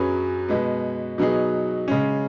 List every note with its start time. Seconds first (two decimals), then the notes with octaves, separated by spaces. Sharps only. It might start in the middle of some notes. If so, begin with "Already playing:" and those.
Already playing: F#2 F#3 C#4 G#4 B4
0.48 B2 G#3 B3
1.18 B2 F#3 B3 D#4 G#4
1.88 C#3 G#3 C#4